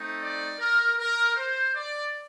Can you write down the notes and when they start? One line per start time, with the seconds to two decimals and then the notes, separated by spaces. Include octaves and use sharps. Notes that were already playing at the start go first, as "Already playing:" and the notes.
Already playing: A3 C4 D#4
0.20 D5
0.58 A#4
0.98 A#4
1.36 C5
1.74 D5